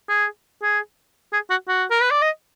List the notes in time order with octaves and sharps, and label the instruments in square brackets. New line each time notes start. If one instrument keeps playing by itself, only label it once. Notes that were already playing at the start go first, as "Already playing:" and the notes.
[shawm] G#4
G#4
G#4
F#4
F#4
A#4
B4
D5
D#5